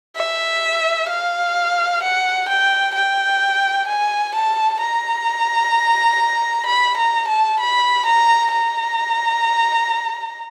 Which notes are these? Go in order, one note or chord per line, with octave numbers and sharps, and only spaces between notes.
E5
F5
F#5
G5
G5
G#5
A5
A#5
B5
A#5
A5
B5
A#5
A#5